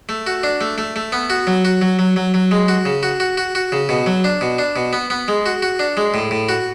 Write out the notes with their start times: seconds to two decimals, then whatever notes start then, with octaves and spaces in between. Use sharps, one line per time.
0.09 A3
0.27 F#4
0.43 D4
0.61 A3
0.78 A3
0.96 A3
1.12 B3
1.30 F#4
1.47 F#3
1.65 F#4
1.82 F#3
1.99 F#3
2.16 F#3
2.34 F#3
2.51 G#3
2.68 F#4
2.85 C#3
3.03 F#4
3.20 F#4
3.37 F#4
3.55 F#4
3.72 C#3
3.89 B2
4.06 F#3
4.24 D4
4.41 B2
4.58 D4
4.76 B2
4.93 B3
5.10 B3
5.28 G#3
5.46 F#4
5.62 F#4
5.79 D4
5.97 G#3
6.14 A2
6.31 A2
6.49 F#4